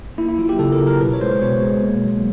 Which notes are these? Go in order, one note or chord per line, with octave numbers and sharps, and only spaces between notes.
A#3 E4
E4
F#3 F4
G4
C#3 A4
A#4
C#3
A#4
B2 B4
C#5
G#3 C5
B2 C#5
G#3
A#3
F#3